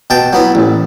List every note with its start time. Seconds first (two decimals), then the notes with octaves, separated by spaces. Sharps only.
0.10 B2 G5 A5
0.33 F#3 B3 E4
0.55 A1